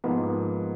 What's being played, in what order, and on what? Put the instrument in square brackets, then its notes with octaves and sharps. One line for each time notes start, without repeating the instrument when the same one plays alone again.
[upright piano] G#2 F3 A#3 [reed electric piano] B3